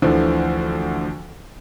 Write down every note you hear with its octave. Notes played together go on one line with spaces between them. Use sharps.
D2 D3 E3 F3